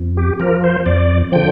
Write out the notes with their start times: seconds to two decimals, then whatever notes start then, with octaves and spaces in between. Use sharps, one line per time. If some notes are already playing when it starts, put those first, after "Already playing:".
Already playing: F2
0.17 G4
0.40 F3 A#4
0.64 C5
0.86 F2 D5
1.32 D3 F3 G5